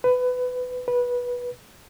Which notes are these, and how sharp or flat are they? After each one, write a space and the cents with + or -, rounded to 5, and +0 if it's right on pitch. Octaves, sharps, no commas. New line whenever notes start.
B4 +20
B4 -15